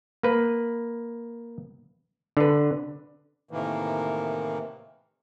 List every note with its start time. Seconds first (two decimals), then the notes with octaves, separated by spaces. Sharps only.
0.23 A#3 B4
2.37 D3 B4
3.51 A2 C3 D#3 E3 A#3